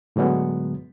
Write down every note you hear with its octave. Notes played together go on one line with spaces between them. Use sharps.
A2 D3 F#3 G#3 B3